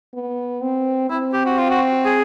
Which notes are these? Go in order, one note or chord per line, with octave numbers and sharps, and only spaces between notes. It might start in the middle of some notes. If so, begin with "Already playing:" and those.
B3
C4
C4 E4
G4
F#4
F4
F#4
G#4